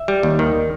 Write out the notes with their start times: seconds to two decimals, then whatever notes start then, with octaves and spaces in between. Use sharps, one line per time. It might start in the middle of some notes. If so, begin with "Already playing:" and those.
Already playing: E5
0.08 G3
0.23 D#2
0.39 D#3